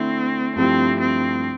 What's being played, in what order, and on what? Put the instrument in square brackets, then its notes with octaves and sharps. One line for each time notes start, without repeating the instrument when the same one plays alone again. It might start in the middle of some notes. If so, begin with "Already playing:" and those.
Already playing: [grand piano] D3 A3 E4 [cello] C4
[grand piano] G2 F3 A3 E4 G4 [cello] C4
[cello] C4